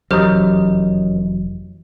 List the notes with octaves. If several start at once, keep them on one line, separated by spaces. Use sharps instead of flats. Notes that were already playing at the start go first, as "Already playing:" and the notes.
F1 F#2 E3 F#3 D#4 G4 C5 F6